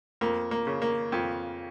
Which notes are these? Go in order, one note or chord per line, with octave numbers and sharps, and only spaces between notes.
F2 A#3
A#3
C#3
A#3
F2